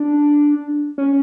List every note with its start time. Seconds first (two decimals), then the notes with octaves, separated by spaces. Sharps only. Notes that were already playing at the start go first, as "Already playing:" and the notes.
Already playing: D4
0.98 C#4